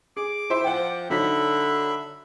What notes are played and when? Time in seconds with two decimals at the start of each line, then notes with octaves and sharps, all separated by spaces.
0.17 G#4 D6
0.50 E4 C5 E5
0.64 F3 F#5 G5
1.10 D3 F#3 D#4 E5 B5 B6